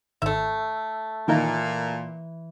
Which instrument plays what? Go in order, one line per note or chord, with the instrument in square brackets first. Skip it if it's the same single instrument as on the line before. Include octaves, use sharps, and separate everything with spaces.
[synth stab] G#1 [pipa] A3 E5
[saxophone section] A#2 [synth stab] D#3 A#3 D#4 [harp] E3